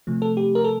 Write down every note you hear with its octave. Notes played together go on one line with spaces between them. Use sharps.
C3 F3 A3
A4
G4
A#4
A4